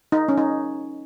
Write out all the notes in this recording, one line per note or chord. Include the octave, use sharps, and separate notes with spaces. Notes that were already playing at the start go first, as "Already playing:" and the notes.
D#4
C#4
D#4